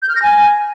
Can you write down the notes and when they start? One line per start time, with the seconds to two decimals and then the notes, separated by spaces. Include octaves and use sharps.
0.02 G6
0.09 F6
0.16 A#6
0.23 G#5